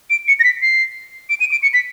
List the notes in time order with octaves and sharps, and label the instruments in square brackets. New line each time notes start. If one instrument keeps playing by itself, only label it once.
[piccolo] D7
C#7
A#6
B6
C7
D7
D#7
D7
C#7
B6